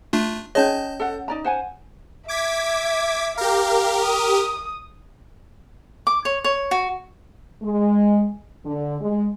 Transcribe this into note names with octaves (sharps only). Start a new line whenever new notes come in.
A3 D4 F4
C#4 G#4 C#5 D#5 A5 G6
A4 F#5
D#4 D5 A#5
C5 F#5 G#5
E5 D6 G#6 B6
G4 A#4 F5
D#6
D6
C#5
C#5
F#4
G#3
D3
G#3